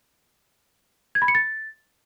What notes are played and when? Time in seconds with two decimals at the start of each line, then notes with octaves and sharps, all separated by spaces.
1.15 G#6
1.22 B5
1.28 C#7
1.35 A6